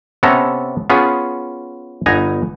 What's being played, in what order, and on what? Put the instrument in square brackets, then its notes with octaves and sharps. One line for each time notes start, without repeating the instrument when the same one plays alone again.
[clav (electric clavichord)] C3 B3 C#4 A4 A#5
B3 C#4 F4 G#4
G1 B3 D#4 G#5 A#5